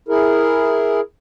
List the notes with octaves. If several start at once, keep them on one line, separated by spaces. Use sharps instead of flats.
E4 G#4 A#4